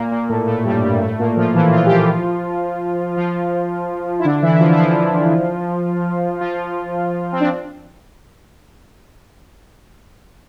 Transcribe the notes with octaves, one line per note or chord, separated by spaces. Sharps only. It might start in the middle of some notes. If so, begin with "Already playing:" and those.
Already playing: A#2 A#3
A#2 A#3
A2 A3
A2 A3
G2 G3
G2 G3
A2 A3
A#2 A#3
F3 F4
E3 E4
F3 F4
G4
F3 F4
F3 F4
E4
D3 D4
E3 E4
E4
F3 F4
E4
F3 F4
F3 F4
C4
D4